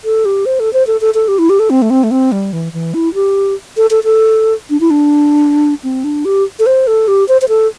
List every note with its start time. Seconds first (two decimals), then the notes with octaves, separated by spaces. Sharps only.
0.05 A4
0.25 G4
0.46 C5
0.60 A4
0.73 C5
0.87 A4
1.01 A4
1.14 A4
1.28 G4
1.39 E4
1.50 G4
1.59 A4
1.70 C4
1.82 A3
1.90 C4
2.04 A3
2.11 C4
2.32 G3
2.53 E3
2.73 E3
2.94 E4
3.14 G4
3.77 A4
3.91 A4
4.04 A4
4.70 D4
4.81 E4
4.91 D4
5.84 C4
6.04 D4
6.25 G4
6.59 A4
6.66 C5
6.87 A4
7.08 G4
7.28 C5
7.42 C5
7.49 A4